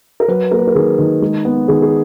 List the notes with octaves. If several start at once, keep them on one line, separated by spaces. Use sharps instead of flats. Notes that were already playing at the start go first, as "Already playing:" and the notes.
A#4
F#3 B4
A#3 A#4
B4
A#4
D#3 G#4
D#3
G#3
B3
D#3 G#4
G#4